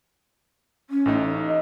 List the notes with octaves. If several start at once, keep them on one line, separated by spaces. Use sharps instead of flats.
C#4
A1 A2 D#4
D#5